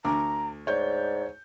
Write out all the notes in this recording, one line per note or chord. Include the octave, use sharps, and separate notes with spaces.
D2 A#5 D6
G#2 C#5 D5 G6